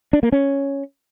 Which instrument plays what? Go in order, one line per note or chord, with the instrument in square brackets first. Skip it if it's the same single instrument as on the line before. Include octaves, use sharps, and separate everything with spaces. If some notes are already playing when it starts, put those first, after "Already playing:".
[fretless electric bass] D4
A#3
C#4